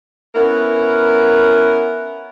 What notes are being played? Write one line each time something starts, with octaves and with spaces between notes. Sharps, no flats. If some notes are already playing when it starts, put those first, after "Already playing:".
B3 C#4 E4 A#4